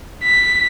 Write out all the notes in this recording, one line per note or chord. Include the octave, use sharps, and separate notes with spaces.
B6